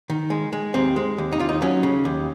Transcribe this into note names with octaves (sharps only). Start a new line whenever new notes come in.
D#3
G#3
G#3
D#2 C4
G#3
D#2
D#4
D#2 F4
D#4
F#3 C#4
C#3
D#2